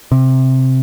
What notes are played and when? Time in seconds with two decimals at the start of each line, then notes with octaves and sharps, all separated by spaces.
0.12 C3